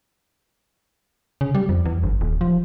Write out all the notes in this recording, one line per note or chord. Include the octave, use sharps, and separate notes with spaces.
C#3
G3
F2
E2
G1
D#1
F3